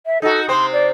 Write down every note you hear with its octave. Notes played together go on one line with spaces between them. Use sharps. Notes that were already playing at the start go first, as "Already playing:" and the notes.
E5
D#4 F#4 A4
C3 C4 C5 C6
D5